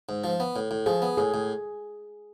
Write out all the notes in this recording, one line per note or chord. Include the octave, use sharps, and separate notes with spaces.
G#2
F3
B3
A2
A2
F3 G#4
B3
A2 G#4
A2